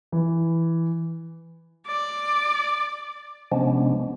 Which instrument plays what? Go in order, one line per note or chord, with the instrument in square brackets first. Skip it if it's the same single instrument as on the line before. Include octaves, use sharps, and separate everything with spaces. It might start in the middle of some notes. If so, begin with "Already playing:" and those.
[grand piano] E3
[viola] D5
[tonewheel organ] C3 F3 G#3 B3 C#4 D4